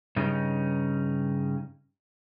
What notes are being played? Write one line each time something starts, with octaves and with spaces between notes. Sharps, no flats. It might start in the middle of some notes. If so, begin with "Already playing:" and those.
G2 C#3 C#4 D#4